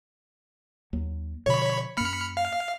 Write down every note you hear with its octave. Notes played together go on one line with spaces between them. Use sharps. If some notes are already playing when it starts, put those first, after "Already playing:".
D#2 F#3
B2 D3 F3 C#5 B5
F#2 A#3 B5 F6 C#7
F5